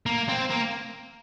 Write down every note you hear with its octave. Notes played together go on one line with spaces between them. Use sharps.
A#3
C4
A#3